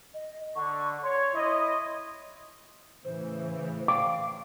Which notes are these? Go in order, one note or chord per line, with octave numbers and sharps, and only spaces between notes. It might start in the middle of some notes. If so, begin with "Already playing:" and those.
D#5
D3 C#6
C#5 C6
E4 D#5
A2 C#3 E3 C5
F5 D6